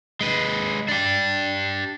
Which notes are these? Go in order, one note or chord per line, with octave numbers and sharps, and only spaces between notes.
G#3 B4
D4 G4